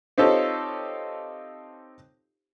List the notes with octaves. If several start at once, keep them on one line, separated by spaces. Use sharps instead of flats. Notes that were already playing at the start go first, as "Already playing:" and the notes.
C4 D#4 F4 G4 A4 C#5